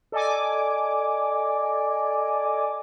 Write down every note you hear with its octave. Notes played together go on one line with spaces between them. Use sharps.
A4 D5 D#5 G#5 D6